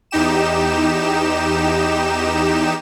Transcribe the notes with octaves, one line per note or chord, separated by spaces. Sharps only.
E2 D#4 G4 E7